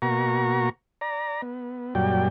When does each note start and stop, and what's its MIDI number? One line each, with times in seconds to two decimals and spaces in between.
0.02 0.69 47
0.02 0.69 58
0.02 0.69 66
0.02 0.69 82
0.02 0.69 85
1.01 1.41 74
1.01 1.41 82
1.42 1.94 59
1.95 2.28 42
1.95 2.28 46
1.95 2.28 54
1.95 2.28 55
1.95 2.28 74
1.95 2.28 79